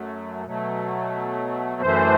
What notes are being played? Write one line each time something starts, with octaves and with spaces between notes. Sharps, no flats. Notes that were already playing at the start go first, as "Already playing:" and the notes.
Already playing: F#2 F#3 A3
B2 F#3 A3
F#2 E3 A3 C5